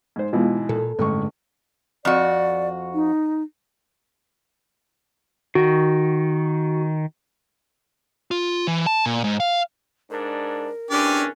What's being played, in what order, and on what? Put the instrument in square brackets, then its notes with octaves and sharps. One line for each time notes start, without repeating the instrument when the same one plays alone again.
[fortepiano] G#2 C5
[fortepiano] G#2 B2 E3 [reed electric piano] G#3 B3 F4
[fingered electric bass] A#2 [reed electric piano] A4
[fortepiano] A1 C#6 [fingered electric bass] G2 D3 G#3
[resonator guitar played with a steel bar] F2 F#4 [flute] D5
[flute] D#4
[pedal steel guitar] D#3 [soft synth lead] F#4
[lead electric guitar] F4
E3
A5
A#2
G#2
F5
[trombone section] G#2 D4 [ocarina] A#4
[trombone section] E2 B2 C#4 [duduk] D4 [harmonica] G4 D5